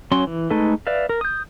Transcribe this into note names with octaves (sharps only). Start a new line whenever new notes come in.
F#3 C#4 C6
E3
G#3 A3 D#4 A4 B4
B4 D5 E5 F5
A#4
D#6 G6